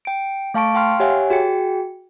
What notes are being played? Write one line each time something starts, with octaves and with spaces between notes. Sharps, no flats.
G5 D7
A3 F5 A5 C#6 D7
F5 G5 C6 F6
G4 C#5 E5 F#5 G#5
F#4 G#4 G5 C#7